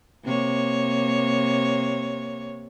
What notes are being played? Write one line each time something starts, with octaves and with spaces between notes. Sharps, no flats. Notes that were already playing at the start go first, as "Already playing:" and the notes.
C3 A#3 C#5